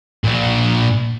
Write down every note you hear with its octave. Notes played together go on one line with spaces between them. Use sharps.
A#2 D4